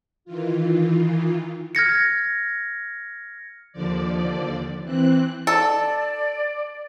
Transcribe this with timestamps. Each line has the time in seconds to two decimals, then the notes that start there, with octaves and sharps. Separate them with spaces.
0.25 D#3 E3 F4
1.75 F6 G#6 A#6 C#7
3.73 D#2 D3 F3 D5
4.83 E3 C4 F#6
5.47 A4 D5